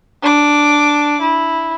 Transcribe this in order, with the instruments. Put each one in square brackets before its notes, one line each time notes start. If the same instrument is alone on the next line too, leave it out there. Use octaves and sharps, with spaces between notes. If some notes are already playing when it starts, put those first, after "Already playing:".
[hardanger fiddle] D4 D6
E4